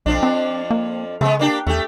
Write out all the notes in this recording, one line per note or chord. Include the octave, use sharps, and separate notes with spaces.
B1 F2 F3 D4
C4
A#3
C#3 G#3 B3
A#3 D4 G4
E2 A3 G4